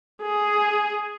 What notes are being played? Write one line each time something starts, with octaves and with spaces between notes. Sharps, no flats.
G#4